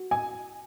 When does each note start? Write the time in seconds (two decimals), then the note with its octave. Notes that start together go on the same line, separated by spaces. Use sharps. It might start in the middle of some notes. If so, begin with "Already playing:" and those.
Already playing: F#4
0.11 G#5